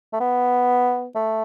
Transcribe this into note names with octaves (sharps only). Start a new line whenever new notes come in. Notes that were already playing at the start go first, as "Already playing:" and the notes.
A3
B3
A3